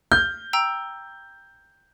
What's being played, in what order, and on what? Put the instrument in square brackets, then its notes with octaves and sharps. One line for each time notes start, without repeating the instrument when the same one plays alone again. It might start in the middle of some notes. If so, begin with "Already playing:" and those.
[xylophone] F6 [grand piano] G6
[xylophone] G5 A#5 E6